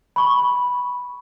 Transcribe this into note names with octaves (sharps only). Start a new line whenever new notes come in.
B5 C#6